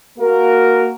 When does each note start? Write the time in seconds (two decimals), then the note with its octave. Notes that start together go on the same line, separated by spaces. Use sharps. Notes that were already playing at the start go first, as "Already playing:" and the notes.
0.18 A#3 F#4 A#4